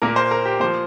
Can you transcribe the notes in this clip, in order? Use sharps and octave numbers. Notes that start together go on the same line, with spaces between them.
A#2 A#3 A#4
C5
A#4
G4
F3 A#3 C5